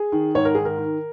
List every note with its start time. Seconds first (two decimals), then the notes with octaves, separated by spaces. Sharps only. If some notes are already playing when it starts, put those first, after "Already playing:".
Already playing: G#4
0.12 D#3
0.35 G#2 C#5
0.45 A#4
0.55 D#3 G#4
0.65 A#4
0.78 D#3